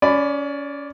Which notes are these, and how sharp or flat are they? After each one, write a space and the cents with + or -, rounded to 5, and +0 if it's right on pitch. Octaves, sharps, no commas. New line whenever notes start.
C#4 +25 D5 +0 B5 +15